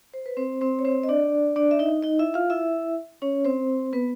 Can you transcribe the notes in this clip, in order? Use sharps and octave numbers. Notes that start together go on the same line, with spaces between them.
C5
B4
C4 C5
C4 C5
C#5
C4 C5
D#5
D4 D5
D4 D5
E5
D#4 D#5
D#4 D#5
E4 E5
F4 F5
E4 E5
C#4 C#5
C4 C5
B3 B4